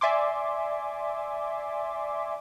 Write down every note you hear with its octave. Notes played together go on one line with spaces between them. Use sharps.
D5 E5 G#5 C6 D6